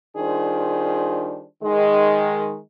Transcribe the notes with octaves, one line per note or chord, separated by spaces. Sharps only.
D#3 G3 D4 F4 G#4 C5
D#3 G#3